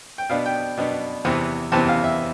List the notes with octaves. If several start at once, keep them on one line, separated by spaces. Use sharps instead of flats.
G5
B2 B3 D4 F5
G5
B2 B3 D4
E2 C3 E3 B3
E2 C3 E3 B3 A5
F5
E5